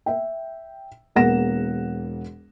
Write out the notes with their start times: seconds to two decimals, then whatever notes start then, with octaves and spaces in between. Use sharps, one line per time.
0.06 E5 G5
1.15 E1 E2 A#3 F#5 A#6 E7